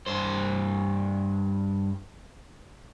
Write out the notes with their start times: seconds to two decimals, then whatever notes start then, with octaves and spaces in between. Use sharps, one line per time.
0.06 G2 C5